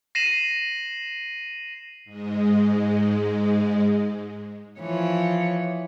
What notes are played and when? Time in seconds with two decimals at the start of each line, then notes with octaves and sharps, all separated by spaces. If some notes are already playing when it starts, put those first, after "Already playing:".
0.15 A#6 C7 D#7 E7 F#7
2.05 G#2 G#3
4.80 E3 F3 C#5